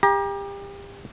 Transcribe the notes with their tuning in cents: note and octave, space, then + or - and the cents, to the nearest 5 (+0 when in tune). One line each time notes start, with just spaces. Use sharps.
G4 +30 A#5 +35